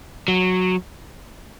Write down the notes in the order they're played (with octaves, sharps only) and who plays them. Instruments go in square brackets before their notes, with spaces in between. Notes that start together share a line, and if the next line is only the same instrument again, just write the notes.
[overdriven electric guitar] F#3